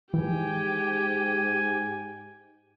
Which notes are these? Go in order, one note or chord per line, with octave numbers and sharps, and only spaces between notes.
G#2 E3 G4 G5 G#5